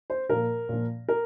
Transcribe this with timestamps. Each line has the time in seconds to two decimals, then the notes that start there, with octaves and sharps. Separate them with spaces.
0.10 C5
0.29 A#2 F3 A#4
0.69 A#2 F3
1.08 A#4